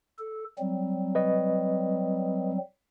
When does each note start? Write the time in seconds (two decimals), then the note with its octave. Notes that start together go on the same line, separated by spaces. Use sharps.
0.19 A4
0.59 F#3 G3 C4
1.15 B4 D#5